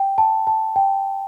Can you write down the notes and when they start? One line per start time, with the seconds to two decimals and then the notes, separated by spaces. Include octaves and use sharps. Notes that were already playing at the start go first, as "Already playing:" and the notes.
Already playing: G5
0.18 A5
0.47 A5
0.76 G5